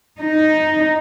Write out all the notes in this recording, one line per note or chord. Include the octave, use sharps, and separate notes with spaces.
D#4